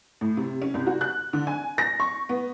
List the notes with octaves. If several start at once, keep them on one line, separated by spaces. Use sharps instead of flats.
A2
C3
C#4
C2
F#4
F#6
D3
G#5
A#6
C#6
B3